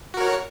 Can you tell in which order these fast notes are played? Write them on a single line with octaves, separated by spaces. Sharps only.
F#4 A#4 C#5